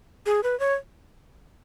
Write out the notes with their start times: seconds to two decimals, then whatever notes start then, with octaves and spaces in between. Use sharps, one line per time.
0.26 G#4
0.43 B4
0.60 C#5